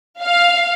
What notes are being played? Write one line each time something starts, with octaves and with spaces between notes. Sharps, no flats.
F5